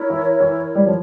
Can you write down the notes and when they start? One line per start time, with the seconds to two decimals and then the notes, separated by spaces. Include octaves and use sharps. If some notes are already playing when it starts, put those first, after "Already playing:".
Already playing: E4 A#4 C#5
0.10 E3
0.40 E3
0.75 G3
0.86 F3